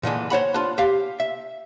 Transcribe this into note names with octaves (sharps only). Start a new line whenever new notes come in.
A#2 D3 E3 G#3
C5 C#5 F#5 B5
D4 F4
G4 F5
E5